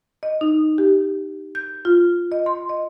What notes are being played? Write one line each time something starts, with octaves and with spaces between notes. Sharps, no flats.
D#5
D#4
G4
G6
F4
D#5
C6
D#5